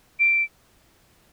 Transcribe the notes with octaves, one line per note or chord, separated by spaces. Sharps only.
D7